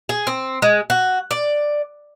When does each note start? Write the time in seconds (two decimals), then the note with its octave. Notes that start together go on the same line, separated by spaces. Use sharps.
0.09 G#4
0.27 C4
0.62 G#3
0.90 F#4
1.31 D5